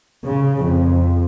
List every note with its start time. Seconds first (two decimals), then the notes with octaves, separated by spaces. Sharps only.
0.23 C#3
0.62 F2